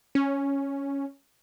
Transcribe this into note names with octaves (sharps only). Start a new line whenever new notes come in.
C#4